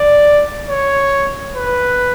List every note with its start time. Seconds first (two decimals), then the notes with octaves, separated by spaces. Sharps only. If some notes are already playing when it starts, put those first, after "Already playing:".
Already playing: D5
0.70 C#5
1.56 B4